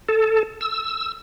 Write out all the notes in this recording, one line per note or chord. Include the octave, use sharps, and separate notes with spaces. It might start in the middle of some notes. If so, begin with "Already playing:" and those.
A4
E6